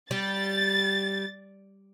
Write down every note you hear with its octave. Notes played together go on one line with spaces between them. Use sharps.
G3 A6